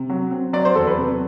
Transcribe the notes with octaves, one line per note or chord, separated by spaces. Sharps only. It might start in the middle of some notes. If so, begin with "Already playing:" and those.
Already playing: C3
F#3
C4
F#3 D5
C5
E2 A4
B4
C3